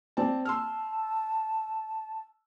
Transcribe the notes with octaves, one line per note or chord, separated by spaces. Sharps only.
C4 D5 A5
A5 C6 E6 F6